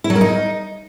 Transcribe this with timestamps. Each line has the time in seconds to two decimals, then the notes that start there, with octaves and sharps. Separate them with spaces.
0.04 E4
0.10 F#3
0.15 A#4
0.21 D#4